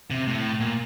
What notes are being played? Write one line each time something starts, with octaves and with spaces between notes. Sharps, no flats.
C3
A2
A#2